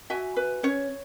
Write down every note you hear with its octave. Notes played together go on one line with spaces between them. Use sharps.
F#4 E5 G#5
B4
C#4 C#5